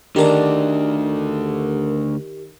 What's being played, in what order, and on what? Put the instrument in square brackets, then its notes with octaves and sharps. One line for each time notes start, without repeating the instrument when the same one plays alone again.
[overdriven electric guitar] D2 D3 [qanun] D#3 D4 D6 [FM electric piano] G4 A#4